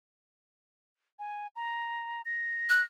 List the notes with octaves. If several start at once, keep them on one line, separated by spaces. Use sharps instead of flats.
G#5
A#5
A#6
F#6